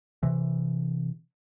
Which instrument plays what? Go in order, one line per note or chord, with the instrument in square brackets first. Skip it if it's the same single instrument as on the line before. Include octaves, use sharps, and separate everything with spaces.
[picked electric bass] C3 E3